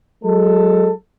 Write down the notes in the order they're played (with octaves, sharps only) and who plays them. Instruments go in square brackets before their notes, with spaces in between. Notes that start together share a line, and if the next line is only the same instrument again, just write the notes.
[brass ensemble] F#3 G#3 A4